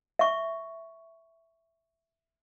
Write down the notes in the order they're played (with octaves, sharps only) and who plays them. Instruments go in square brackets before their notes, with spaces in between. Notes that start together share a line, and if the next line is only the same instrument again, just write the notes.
[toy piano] E5 C#6